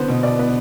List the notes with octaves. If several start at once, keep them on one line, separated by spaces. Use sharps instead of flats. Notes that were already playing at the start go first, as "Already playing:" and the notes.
Already playing: D3 B3 C5
B2
B2 D5
B3